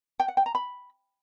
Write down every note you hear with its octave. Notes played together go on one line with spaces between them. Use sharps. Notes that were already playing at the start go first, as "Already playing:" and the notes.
G5
F#5
G5
A#5
B5